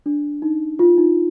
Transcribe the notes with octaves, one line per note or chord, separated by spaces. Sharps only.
D4
D#4
F4
D#4